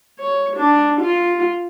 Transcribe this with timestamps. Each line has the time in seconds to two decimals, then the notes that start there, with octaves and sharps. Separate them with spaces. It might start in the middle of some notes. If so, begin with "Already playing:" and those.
0.19 C#5
0.57 D4
1.01 F4